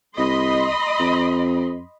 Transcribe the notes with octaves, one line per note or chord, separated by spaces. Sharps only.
C2 D#5 B5 C6
F2